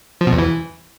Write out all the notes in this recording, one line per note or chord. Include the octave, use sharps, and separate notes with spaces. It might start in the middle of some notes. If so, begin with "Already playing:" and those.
F3
B2
E2
E3